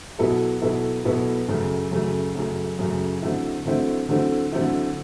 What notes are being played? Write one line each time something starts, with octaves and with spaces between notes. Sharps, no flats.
B2 F#3 B3 E4 A4
B2 F#3 B3 E4 A4
B2 F#3 B3 E4 A4
F#2 C#3 F#3 A3
F#2 C#3 F#3 A3
F#2 C#3 F#3 A3
F#2 C#3 F#3 A3
D3 F#3 A3 C4 E4
D3 F#3 A3 C4 E4
D3 F#3 A3 C4 E4
D3 F#3 A3 C4 E4